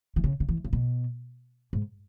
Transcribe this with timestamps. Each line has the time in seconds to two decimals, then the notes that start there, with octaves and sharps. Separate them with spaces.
0.16 E3
0.24 C#3
0.40 C#3
0.49 E3
0.64 C#3
0.73 B2
1.73 G#2